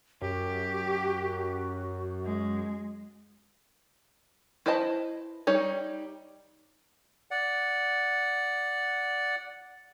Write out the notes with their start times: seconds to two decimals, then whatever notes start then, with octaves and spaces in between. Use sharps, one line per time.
0.22 F#2 F#4 G4
2.25 G#3
4.66 E4 B4 C5 D#5 A5
5.47 G3 D#4 C#5
7.31 D5 F#5